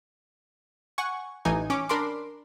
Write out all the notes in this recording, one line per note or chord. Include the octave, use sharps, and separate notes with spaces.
F#5 G#5 C#6
A1 E3 D#4 G#5
C#4 D6
D4 A#4 B5 C6 D6